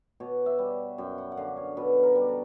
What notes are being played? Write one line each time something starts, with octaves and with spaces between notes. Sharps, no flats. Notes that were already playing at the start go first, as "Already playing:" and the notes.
B2 C#5
E5
G3
F#2 G5
F#5
F#5
D3 F5
C#5
B2 B4
A#4
G3
A4